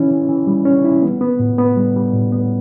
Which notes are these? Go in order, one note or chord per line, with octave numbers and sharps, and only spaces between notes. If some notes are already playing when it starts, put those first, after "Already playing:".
Already playing: E3 C#4 E4
E3
E3
G3
C#4
E4
B3
B3
A2
B3
G3
G3
A2
B3